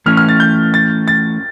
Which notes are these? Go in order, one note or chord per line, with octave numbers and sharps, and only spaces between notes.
E3 A3 C#4 F6
F6
A6
G6
A6
A6